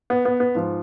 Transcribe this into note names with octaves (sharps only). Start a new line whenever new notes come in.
B3
B3
B3
G#2 F3